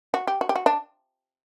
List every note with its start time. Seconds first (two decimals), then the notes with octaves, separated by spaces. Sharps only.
0.14 F#4
0.27 G4
0.41 F#4
0.49 G4
0.56 F#4
0.66 D4